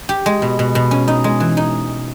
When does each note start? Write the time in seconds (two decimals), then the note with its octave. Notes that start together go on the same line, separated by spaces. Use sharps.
0.09 G4
0.26 G#3
0.42 B2
0.59 B2
0.75 B2
0.91 C#4
1.08 D#4
1.24 G#3
1.40 E3
1.57 D#4